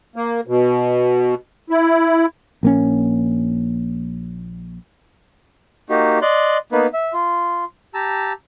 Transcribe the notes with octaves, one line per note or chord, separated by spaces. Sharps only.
A#3
B2
E4
A#1 A#3 C#4
A#3 D#4 F#4 G4
D5 D#5 C6 F#6
A#3 B3 D#4 B4
E5
F4
G4 A5 A#5 E6